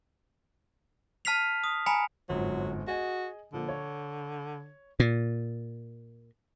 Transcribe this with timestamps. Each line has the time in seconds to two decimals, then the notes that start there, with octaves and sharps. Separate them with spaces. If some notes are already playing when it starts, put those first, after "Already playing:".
1.25 A5 F6 B6 C7 F7
1.64 D#6
1.86 G#5 A#5 B5 C#7 F7
2.29 G1 F2 G#2 F#3
2.87 F#4 G#4 D#5 G#5
3.53 A#2 D3 F3 A#3
3.69 C#5
5.00 A#2